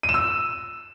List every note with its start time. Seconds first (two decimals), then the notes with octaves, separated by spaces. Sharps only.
0.03 D#7
0.09 E7
0.14 E6